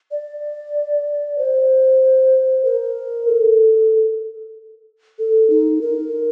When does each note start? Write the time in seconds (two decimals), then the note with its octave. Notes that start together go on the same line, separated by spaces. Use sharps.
0.11 D5
1.38 C5
2.65 A#4
3.28 A4
5.19 A4
5.50 D#4
5.81 A#4